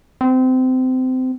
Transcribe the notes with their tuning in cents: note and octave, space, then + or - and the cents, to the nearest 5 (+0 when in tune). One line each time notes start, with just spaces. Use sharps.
C4 -25